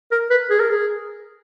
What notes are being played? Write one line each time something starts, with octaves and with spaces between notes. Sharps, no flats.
A#4
B4
G#4
A#4
G#4